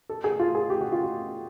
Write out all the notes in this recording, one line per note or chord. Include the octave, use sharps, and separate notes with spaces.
A4
G#4
F4
G#4
G4
F#4
F4
F#4